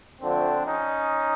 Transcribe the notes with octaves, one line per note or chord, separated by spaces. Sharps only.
D3 F3 A3 C4 D4
C#4 D#4